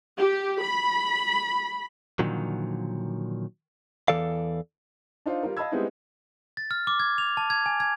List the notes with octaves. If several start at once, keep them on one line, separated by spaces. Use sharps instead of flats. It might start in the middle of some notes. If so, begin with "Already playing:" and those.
G4
B5
A#2 D3 D#3 F3 F#3
E2 G2 E3 A4 D5 F5
D4 D#4 F4 C5
G3 F4 A#4
D#5 F5 A5 B5 E6 G#6
G3 G#3 B3 C4 D#4 E4
A6
F6
D6
G#6
F7
A5
G#6
G#5
G#6